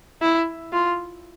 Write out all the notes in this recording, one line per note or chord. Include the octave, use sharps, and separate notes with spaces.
E4
F4